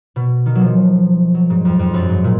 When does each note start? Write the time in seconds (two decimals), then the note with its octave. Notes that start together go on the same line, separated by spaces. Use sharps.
0.16 B2
0.46 D#3
0.55 F#3
0.61 F3
1.34 F#3
1.50 G#2
1.65 F2
1.79 F2
1.94 F#2
2.09 G#2
2.24 A#2